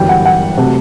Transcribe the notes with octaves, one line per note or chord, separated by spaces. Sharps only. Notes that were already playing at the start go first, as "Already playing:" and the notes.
Already playing: G1 F#2 E3 G3 G5
F#5
F#5
C3 F#3 A3